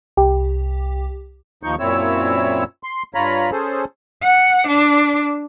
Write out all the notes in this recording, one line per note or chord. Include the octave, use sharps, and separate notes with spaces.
C2 G4
D#2 F3 D#4 C#6 G6
F#2 A#2 C4 E4 C#5 E6
C6
G2 F4 C#5 A#5 B5
C#4 G#4 A4 C5
F#5
D4